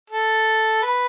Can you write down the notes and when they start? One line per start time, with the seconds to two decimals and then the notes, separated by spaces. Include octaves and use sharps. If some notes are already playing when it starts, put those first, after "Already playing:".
0.10 A4
0.83 B4